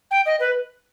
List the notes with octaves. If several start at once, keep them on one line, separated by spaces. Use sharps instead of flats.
G5
D#5
B4